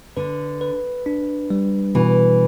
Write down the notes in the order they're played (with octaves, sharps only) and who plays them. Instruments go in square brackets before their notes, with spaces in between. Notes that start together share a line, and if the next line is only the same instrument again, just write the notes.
[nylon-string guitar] D3 [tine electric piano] B4
[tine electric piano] B4
D4
G3
[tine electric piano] B2 [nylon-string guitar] E3